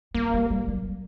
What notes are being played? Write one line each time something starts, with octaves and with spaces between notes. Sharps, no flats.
G3 A#3
G3
G3
F#3